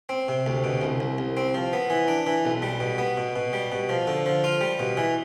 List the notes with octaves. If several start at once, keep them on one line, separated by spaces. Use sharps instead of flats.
C4
C3
D2
B2
C2
C2
C2
C4
F3
B3
E3
D4
E3
B1
G3
B2
B3
B2
B2
G3
B2
F3
D3
F3
F4
G3
B2
E3